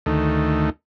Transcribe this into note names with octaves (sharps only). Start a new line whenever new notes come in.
D2 D#3 A3